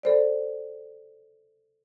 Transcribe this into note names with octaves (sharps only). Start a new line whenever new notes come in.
A4 C5 D5